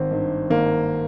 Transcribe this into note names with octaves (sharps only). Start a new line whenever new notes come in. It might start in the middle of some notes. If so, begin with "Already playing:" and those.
Already playing: G#1 C4
G2 D#3
G#1 A#3